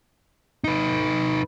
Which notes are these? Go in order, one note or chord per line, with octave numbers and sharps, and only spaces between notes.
D#4 B4